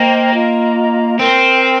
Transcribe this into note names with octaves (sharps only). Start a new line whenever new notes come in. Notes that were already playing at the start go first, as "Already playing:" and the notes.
Already playing: A#3 C5 D#5 G5 A#5
F4 D#5 A#5
C4 A#4 G5 C6